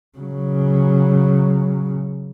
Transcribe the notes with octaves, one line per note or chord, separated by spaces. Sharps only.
C#3 F#3